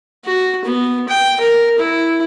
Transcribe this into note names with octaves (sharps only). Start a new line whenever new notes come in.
F#4
B3
G5
A#4
E4